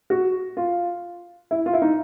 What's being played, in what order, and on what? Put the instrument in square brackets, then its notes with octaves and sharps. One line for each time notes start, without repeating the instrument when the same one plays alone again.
[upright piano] F#4
F4
E4
F4
E4
D#4